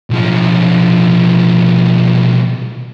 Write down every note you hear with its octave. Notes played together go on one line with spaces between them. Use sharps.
B1 F3